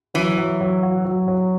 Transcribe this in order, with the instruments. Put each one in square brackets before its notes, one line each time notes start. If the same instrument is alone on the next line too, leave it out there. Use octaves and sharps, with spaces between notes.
[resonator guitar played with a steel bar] E3 [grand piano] F#3
[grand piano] F#3
F#3
F#4
F#3
F#3